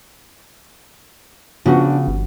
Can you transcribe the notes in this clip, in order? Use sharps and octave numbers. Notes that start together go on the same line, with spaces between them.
C#3 F3 B3 D4 F#4
G1